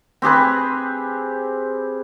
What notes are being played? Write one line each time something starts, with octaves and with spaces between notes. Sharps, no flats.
C4 G4 G#4 B4